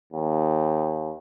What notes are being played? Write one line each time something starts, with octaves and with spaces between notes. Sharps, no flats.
D#2